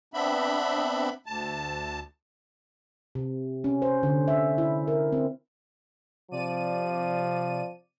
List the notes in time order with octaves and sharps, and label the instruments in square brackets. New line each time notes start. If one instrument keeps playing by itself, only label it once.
[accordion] B3 C4 D4 E5 B5
D2 A5
[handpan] C3
C#4
C5
D3
E5
E4
A#4
C4
[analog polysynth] C3 D5 D#7 [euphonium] F3